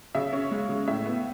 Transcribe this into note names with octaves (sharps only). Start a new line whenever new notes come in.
C#3 E5
C#4
G#3
C#3
A2 E5
B3